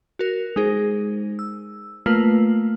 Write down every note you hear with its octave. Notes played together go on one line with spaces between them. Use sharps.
F#4 A#4
G#3 D#4 G#4 C5
E6
A3 A#3 F4 A#4 B4 F5